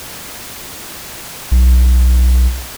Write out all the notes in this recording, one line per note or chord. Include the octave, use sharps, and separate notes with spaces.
B1